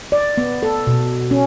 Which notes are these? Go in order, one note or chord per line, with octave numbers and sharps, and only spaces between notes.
D5
B3
A4
B2
C#4